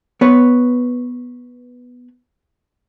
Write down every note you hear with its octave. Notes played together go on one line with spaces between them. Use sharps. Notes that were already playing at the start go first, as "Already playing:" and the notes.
B3 B4 C#5